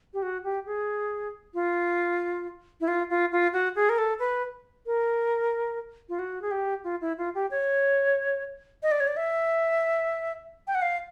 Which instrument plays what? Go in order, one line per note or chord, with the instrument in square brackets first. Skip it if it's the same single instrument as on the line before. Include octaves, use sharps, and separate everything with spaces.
[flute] G4
F#4
G4
G#4
F4
E4
F4
F4
F4
F#4
G#4
A#4
A4
B4
A#4
F4
F#4
G#4
G4
F4
E4
F4
G4
C#5
D#5
D5
C#5
D5
E5
G5
F#5
F5